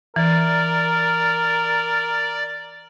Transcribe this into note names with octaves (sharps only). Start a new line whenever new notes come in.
E3 A#4 D5